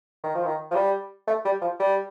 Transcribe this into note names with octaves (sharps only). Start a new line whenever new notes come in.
D#3
F3
D#3
F3
G3
A3
G3
F3
G3